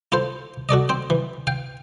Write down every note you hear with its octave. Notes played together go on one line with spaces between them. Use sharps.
E4 F4 A4 C5
F#4 A4 D5 D#5
C4 C5
E3
F5 G5